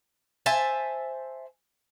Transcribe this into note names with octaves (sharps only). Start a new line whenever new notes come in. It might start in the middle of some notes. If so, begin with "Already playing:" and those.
C5 E5 G#5 A5